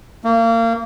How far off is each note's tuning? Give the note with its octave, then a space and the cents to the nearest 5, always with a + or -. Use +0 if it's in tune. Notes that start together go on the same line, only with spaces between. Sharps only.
A#3 -30